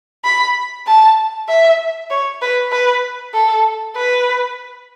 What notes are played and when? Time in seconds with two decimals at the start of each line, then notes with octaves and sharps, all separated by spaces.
0.25 B5
0.87 A5
1.48 E5
2.10 C#5
2.42 B4
2.72 B4
3.34 A4
3.96 B4